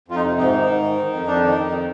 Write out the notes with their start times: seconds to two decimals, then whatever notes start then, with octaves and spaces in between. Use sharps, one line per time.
0.08 F2 F4
0.15 D#4
0.23 C3
0.38 G#2 D#4
0.53 D#3
0.61 D#4
0.68 G#2
0.83 D#3
0.98 D#3
1.12 F2
1.27 F2 D4
1.42 D#3
1.50 D#4
1.56 F2
1.72 D#3